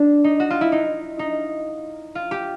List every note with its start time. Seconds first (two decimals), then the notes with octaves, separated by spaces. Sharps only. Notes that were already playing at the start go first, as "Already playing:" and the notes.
Already playing: D4
0.24 D#4
0.40 F#4
0.50 F4
0.61 E4
0.72 D#4
1.19 D#4
2.15 F4
2.31 G4